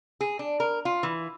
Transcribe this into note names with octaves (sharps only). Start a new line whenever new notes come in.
G#4
D4
A#4
F4
E3